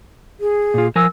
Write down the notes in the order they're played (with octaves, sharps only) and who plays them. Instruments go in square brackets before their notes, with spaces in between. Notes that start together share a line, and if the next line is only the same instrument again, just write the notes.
[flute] G#4
[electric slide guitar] A#2 F4
[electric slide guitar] F3 A#4 G#5 [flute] E6